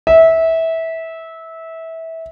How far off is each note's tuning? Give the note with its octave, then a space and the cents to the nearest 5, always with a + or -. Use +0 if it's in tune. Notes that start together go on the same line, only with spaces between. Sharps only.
E5 -20